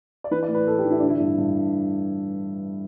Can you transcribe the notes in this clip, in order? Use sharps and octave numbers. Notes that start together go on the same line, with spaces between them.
D5
E3 B4
D5
A2
B4
A2 A4
G4
E3
E4
D3 D4
E4
G2
G2